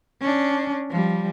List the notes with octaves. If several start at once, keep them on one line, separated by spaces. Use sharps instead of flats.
C#4 D4
F3 G3